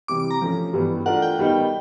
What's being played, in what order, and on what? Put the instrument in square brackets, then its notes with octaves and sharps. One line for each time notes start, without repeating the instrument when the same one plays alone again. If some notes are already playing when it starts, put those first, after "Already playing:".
[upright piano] C3 E3 G3 [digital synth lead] D6
[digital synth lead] D6
A#5
[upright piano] F3 A3 C#4
G2 E3 G3 B3
[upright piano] A3 D4 F4 A#4 [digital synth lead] F#5
[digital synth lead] G5
[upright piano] D#3 G3 B3 D#4